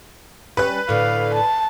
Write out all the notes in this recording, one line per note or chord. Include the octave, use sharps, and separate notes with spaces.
G3 C#4 B4 F#6
A2 D3 F5
A5